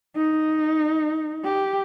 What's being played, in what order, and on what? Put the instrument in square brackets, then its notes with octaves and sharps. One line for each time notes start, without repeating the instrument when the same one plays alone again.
[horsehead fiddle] D#4
G4